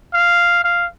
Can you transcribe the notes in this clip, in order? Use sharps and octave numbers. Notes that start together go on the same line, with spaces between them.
F5
F5